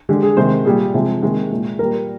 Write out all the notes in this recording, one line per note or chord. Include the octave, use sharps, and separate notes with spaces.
D3 G#3 G4
G#4
C3 D#3 G#3 C5
A#2 G3 G#4
C3 F3 G#3
C3 D#3 G#3
A#2 G#3
A#2 G3 A#4